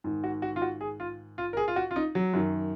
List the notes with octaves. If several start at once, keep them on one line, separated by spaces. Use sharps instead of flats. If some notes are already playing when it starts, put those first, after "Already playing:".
G#2 D#3
F#4
F#4
F4
F#4
G#4
F4
F4
A#4
G#4
F4
F#4
F4
D#4
F#3
F#2 D#3